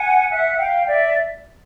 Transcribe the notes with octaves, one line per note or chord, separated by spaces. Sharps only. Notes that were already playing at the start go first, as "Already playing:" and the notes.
Already playing: F#5 G#5
E5 F#5
F5 G5
D5 E5